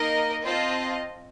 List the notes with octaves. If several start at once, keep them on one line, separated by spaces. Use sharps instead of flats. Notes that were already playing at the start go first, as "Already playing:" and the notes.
Already playing: A#3 D#4 A#4 D#5
C4 F4 C5 D#5 A5